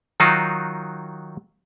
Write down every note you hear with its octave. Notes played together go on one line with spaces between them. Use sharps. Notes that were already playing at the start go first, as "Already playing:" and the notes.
D#3 F#3 D#4 F4 F#4